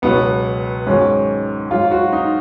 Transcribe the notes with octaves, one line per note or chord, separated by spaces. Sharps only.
C#2 B2 F#3 B3
G#2 D#3 F#3 C#4
G#2 F#3 F4
F#4
D#4